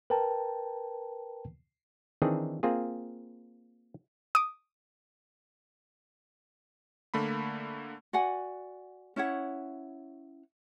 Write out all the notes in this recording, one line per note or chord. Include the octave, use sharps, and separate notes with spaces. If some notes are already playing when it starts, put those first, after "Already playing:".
A#4 B4 G5 A5 A#5
D#3 E3 C4 D4 D#4 G#4
A#3 C4 F4 G#4
D6 D#6
D3 A3 A#3 B5
F#4 D5 F#5 G#5
C#4 E4 C#5 F#5